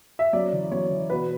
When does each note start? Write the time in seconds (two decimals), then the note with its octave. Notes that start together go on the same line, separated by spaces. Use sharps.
0.19 E5
0.33 F#2 D5
0.53 E3
0.72 F#2 C#5
0.91 E3
1.10 B2 B4